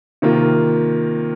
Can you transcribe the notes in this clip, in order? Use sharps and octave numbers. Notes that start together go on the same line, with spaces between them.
C3 D#3 A#3 F4